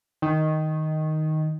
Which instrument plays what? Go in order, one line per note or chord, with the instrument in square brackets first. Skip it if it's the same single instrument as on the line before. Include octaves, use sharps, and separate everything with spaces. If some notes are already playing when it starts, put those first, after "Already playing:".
[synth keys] D#3